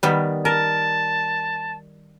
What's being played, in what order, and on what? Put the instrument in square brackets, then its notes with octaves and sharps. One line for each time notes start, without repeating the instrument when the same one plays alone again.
[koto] D#3 G3 B3
[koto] A#4 [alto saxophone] A5